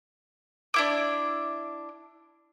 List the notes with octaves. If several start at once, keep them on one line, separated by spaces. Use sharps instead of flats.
D4 E4 D6